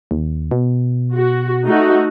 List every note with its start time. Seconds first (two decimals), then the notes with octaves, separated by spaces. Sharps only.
0.11 D#2
0.51 B2
1.14 F#4
1.66 A3 D#4 F#4